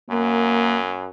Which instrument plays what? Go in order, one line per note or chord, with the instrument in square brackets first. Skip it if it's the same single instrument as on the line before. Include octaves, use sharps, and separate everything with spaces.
[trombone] F#2 [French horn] A#3